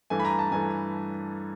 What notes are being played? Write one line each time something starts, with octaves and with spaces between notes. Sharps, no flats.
G2 E3 A3 G#5
B5
A#5
A5
G2 E3 A3 G#5